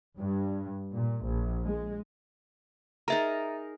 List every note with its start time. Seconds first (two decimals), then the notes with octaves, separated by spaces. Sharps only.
0.18 G2
0.93 A#2
1.24 A#1
1.65 G#3
3.08 D#4 G#4 A#4 E5 A#5